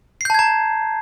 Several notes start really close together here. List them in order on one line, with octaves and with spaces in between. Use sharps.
C7 G6 A5 G#6 A#5